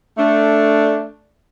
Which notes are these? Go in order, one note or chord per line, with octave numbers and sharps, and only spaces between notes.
A3 D4